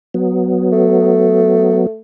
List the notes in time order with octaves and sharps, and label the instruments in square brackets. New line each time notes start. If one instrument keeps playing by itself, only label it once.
[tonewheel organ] F#3 B3
[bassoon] A3